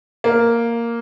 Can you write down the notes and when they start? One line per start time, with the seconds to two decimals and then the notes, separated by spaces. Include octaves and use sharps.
0.24 A#3